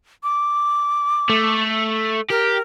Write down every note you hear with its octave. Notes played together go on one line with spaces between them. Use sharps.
D6
A3
G4 A#4